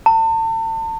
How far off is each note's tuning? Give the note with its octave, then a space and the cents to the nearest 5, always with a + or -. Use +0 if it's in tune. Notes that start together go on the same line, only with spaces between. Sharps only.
A5 +35